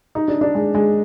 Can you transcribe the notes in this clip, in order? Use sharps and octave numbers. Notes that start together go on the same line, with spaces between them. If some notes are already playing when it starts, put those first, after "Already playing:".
D#4
D4
D4
G#3
G#3